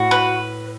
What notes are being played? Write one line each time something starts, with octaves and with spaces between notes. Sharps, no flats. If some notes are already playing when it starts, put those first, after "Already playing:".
Already playing: A2 F#4
B4